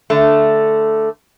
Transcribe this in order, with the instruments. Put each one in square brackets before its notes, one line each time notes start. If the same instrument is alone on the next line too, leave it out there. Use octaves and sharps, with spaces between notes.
[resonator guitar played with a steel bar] D3 A3